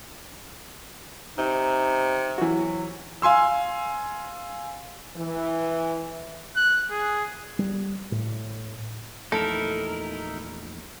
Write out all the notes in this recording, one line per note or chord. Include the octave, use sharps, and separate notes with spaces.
C3 D#4
E3 F#3 F#4
F5 G#5 C6 E6
E3
F#6
G#4
G3
A2
A#1 E2 A3 D#4 E4 A4 A#4